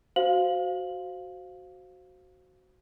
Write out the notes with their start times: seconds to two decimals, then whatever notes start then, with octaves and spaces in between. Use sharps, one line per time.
0.16 F#4 C5 F5 F#7